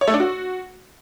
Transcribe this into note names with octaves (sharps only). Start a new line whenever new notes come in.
C#5
A3
D4
F#4